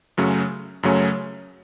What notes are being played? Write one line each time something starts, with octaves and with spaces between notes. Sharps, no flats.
F#2 C#3 F#3 A3 C#4
F#2 C#3 F#3 A3 C#4